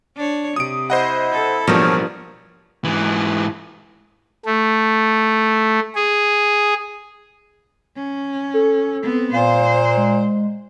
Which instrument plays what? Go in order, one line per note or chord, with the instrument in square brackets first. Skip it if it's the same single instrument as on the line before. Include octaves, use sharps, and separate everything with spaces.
[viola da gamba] D4 C#5
[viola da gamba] C3 [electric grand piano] D#6 D7
[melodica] E4 [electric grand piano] C5 D#5 F#5
[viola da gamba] A4
[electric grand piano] A1 B2 [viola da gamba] G2 [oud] F3 A#3 [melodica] A#4 C#5
[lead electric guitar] G#2 E3
[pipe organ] A3
G#4
[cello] C#4
[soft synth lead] A4
[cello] B3 C4
[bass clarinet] A#2 [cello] C5 [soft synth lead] F5
[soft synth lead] G#3